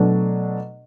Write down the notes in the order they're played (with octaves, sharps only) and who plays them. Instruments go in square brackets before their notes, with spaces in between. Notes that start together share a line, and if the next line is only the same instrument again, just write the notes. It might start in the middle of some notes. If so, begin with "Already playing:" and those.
Already playing: [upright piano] B2 F#3 A3 D4